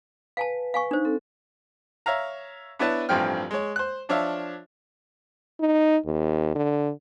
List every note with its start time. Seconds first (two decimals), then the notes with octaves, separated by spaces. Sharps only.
0.37 B4 F5 G#5 A5
0.74 F5 G#5 C#6
0.91 D4 D#4 C5
1.05 C4 A4
2.06 C#5 E5 F5 A#5
2.79 B3 D4 E4 B4 C#5 A5
3.09 A1 G2 F3 C4 G5 F6
3.51 G#3 C#5
3.76 C5 F#6
4.09 F3 D4 C#5 E5 F5
5.60 D#4
6.06 D#2
6.55 D3